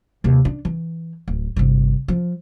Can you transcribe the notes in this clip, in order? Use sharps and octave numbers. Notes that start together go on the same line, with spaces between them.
D#2 C3
D4
E3
D1
G1 C3
F3